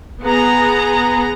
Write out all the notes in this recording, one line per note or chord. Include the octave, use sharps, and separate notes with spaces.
B3 G#4 A#5